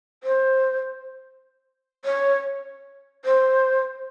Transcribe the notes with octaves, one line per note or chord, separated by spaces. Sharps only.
C5
C#5
C5